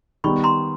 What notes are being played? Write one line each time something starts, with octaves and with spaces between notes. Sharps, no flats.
D#3 G3 B3 B5 C#6
A#5 C6